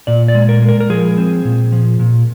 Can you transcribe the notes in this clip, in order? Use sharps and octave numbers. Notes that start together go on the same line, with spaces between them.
A#2 D5
D5
G#3
A#4
G#3
A#4
A#4
F3 G#4
C4
A#2
F3
A#2